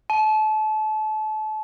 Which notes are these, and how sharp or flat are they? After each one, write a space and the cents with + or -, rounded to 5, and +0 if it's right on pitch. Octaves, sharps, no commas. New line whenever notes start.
A5 -30